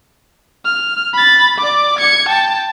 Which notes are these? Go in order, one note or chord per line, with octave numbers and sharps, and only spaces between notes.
F6
B5 A6
D5 D6
G#6 C#7
G5 A5